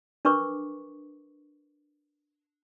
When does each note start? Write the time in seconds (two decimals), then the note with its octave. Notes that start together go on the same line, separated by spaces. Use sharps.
0.25 D4 A#4 B4 C#6 D6